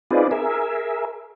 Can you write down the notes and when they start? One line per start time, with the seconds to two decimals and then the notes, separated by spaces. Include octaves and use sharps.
0.11 C4 D#4 F4 G#4 B4 D5
0.31 G#4 A#4 E5